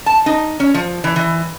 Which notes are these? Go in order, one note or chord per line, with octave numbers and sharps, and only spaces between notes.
A5
D#4
C#4
F3
E3
E3